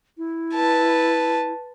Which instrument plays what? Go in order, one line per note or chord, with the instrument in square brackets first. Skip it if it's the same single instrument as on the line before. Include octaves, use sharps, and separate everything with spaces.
[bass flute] E4
[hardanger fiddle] B4 A5